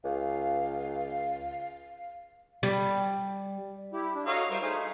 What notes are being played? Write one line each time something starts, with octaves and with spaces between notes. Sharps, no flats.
C#2 F5
G3
E4 G4
D4
F#4 A4 C#5 D#5 F5 A#5
G3 F4 A#4 C5 E5
A3 D#4 G#4 C5 F5